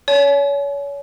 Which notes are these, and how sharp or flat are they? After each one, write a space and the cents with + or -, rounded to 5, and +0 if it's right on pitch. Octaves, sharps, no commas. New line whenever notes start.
C#5 +30 G#5 +45